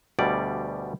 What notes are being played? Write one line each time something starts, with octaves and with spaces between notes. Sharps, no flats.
D2 B2 G3 D5